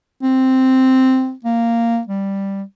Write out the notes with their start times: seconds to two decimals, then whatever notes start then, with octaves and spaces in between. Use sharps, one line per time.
0.22 C4
1.45 A#3
2.07 G3